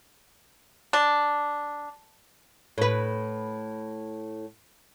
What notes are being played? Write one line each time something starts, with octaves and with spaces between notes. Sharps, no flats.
D4
A2 B4